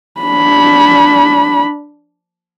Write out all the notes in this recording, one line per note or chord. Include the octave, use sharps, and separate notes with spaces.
D4 B5